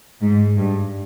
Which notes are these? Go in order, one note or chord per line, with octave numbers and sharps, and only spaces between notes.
G#2
G2